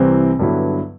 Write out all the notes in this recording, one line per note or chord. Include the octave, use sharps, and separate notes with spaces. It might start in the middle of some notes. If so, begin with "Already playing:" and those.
Already playing: C2 C3 E3 G3 C4
G2 D3 F#3 B3 E4